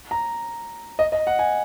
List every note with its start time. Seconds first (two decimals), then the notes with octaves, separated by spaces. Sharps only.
0.11 A#5
0.99 D#5
1.12 D#5
1.27 F#5
1.39 G#5